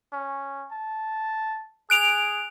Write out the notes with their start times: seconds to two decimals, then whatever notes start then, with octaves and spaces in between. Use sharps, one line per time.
0.13 C#4
0.71 A5
1.90 G#4 F#6 D7 F7